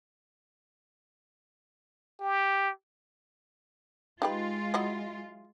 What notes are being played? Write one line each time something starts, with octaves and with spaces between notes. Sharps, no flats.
G4
G#3 D#4 F4 G4 B4
F#3 E4 D#5